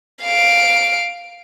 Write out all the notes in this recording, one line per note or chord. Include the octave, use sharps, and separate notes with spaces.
F5 D7